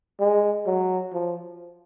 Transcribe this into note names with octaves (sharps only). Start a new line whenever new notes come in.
G#3
F#3
F3